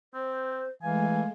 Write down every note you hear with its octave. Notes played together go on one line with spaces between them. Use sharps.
C4 C5
E3 G#3 A3 F5 G#5